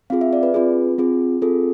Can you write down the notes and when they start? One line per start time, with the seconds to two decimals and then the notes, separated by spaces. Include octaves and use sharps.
0.10 C4 F4 G#4 F5
0.21 E5
0.33 D5
0.43 B4
0.54 C4 F4 G#4 B4
0.98 C4 F4 G#4
1.42 C4 F4 G#4 A4